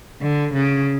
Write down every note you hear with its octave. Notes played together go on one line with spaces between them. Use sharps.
D3
C#3